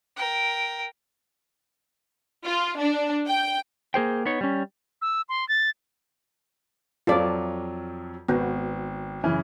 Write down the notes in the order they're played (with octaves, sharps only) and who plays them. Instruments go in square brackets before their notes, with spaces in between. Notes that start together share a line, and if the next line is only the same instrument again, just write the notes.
[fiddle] A#4 G5
[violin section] F4
D4
G5
[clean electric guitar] A#3 G#4 C5 G5
B3 D#4 C#5
G3 C#4
[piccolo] E6
C6
A6
[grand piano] F2 F3 F#3 [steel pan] F4 A4 D5
[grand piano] G#1 [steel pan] B3 F#4
[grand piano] F#2 C#3 E3